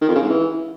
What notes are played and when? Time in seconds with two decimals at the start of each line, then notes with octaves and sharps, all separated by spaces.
0.02 D#3
0.09 F2
0.16 C#3
0.23 G#2
0.30 E3